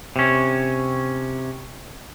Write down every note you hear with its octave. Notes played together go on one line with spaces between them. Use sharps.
C3 C#4